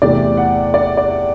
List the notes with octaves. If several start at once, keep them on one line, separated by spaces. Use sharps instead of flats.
E2 C3 E3 A3 D5
F#5
D5
D5